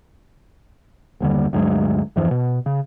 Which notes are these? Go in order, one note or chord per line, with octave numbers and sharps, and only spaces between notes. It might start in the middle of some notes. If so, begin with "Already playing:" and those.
F#1 D#2 D3 G3
D2 G2 F#3 G#3
E2 G2 E3 F3
B2
C#3